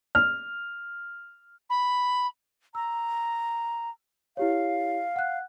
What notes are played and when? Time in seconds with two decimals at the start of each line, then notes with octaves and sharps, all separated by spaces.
0.15 F6
1.69 B5
2.75 A#5 E6
4.37 E4 G4 C#5 F5
5.16 F#5 F#6